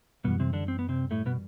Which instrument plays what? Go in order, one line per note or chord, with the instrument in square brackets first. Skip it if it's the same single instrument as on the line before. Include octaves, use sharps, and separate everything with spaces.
[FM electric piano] F#2 E3 G3 [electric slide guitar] B2 B3
[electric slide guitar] C3 C4
D3 D4
C4
B3
C3 C4
A2 A3
B2 B3